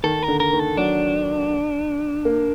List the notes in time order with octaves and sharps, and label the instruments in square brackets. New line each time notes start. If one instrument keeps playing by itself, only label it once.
[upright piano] D#3 [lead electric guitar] A4
[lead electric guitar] A#4
[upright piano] D3
[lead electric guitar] A#4
[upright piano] D#3
[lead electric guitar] A4
[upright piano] F#3 [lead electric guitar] D4
[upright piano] A#3